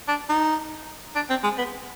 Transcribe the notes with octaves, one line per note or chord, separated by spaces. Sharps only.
D4
D#4
D4
C4
G#3
B3